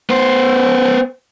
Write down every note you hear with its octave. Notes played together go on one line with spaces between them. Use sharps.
B3 C5